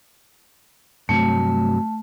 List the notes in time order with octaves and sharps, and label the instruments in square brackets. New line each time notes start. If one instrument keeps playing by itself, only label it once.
[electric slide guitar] G2 C3 F#3 [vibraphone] A3